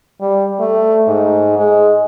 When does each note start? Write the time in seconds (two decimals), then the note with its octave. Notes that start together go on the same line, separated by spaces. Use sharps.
0.21 G3
0.60 A3
1.07 G#2
1.58 G#3